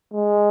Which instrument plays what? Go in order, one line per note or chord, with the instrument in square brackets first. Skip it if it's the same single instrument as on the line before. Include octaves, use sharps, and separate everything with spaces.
[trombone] G#3